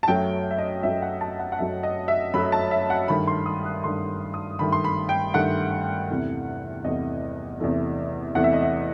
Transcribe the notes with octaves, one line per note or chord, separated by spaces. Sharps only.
A5
F#2 F#3 A3 G5
E5
D#5
F#2 F#3 A3 E5
F#5
A5
F#5
F#5
F#2 F#3 A3 E5
D#5
E5
F#2 F#3 A3 B5
A5
E5
F#5
G2 D#3 A3 B5
C6
D#6
F#6
G2 D#3 A3 C6
D#6
G2 D#3 A3 B5
C6
B5
G5
G2 D#3 A3 F#5
E2 C3 E3 A3
E2 C3 E3 A3 D#5
E2 C3 E3 A3
E2 C3 E3 A3 F#5
E5
D#5
E5